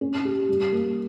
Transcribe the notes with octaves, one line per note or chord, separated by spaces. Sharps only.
C#4
G4
G3
A#3